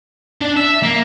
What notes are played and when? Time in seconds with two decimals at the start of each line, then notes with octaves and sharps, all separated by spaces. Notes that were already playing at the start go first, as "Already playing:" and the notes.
0.42 D4
0.57 E5
0.83 A#3